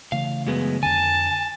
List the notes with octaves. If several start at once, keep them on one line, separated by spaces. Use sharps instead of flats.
C#3 E3 A3 F5
F#2 G#3 B3
F2 D3 G#5 A5